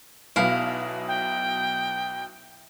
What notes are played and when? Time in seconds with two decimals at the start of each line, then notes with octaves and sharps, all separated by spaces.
0.36 B1 B2 F#3 E4 F5
1.07 G5